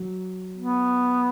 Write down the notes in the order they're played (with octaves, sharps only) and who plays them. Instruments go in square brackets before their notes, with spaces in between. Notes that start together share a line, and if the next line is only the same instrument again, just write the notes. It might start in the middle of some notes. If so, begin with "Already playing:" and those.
Already playing: [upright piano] F#3
[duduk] B3